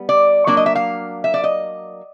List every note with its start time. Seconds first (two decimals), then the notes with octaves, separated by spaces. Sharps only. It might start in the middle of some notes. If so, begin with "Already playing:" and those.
Already playing: G3 B3
0.09 D5
0.47 F#3 A#3 D4 D5
0.57 D#5
0.66 E5
0.75 F5
1.24 E5
1.34 D5
1.44 D#5